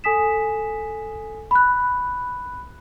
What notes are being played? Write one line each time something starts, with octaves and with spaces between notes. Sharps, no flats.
A4 G#5 D#6 B6 E7
B5 F#6